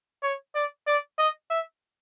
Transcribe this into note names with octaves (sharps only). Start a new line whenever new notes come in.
C#5
D5
D5
D#5
E5